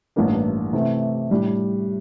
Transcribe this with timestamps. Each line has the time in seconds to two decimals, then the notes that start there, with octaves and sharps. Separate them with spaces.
0.16 A1 G2 E3 A#3 D4
0.73 C3 E3 A3
1.31 A2 G3 D4